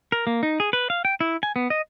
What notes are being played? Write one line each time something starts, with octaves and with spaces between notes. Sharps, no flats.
A#4
A#3
D#4
G#4
B4
F5
G5
E4
G#5
B3
D#5